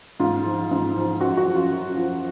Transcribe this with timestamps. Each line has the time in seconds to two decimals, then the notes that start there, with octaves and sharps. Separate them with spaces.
0.20 G#2 F4
0.45 F3
0.71 G#2
0.96 F3
1.21 F#2 F#4
1.37 F#4
1.46 F3
1.55 F4
1.72 F#2
1.97 F3